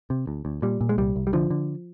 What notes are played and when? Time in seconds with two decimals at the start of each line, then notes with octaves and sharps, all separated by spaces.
0.10 C3
0.27 D2
0.45 D2
0.62 A#2 G3
0.81 A#2
0.89 G#3
0.98 C2 G3
1.16 C2
1.27 G3
1.33 D3 F3
1.51 D3